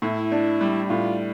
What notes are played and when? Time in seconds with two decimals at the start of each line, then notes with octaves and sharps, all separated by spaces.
0.02 A2 E4
0.32 D4
0.61 G3
0.89 A2 F4